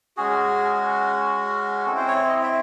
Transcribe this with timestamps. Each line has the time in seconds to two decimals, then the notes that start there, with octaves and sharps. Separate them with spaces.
0.17 G#3 C#4 F#4 G#4
1.86 C4 E4 A4
1.97 C5
2.08 C#5
2.29 D#5
2.43 E5